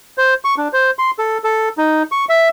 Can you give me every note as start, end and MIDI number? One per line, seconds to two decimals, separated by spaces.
0.18 0.34 72
0.44 0.55 85
0.57 0.68 62
0.73 0.91 72
0.99 1.11 84
1.19 1.38 69
1.44 1.69 69
1.78 2.03 63
2.12 2.25 85
2.29 2.49 76